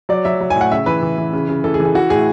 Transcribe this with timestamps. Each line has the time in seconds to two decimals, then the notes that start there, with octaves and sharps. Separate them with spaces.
0.09 F#3 D5
0.25 F#3 E5
0.41 F#3
0.50 G#5
0.56 A2
0.61 F#5
0.71 C#3 E5
0.86 E3 B4
1.03 E3
1.18 E3
1.33 C#3
1.49 C#3
1.64 E3 A4
1.74 G#4
1.80 E3
1.85 G#4
1.95 E3 F#4
2.10 A2 G#4